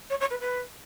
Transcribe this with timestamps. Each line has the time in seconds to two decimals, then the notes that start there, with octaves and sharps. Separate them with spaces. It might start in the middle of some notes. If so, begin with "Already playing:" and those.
0.10 C#5
0.20 C#5
0.30 B4
0.40 B4